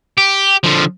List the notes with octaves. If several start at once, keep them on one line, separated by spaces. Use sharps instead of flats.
G4
D3 F3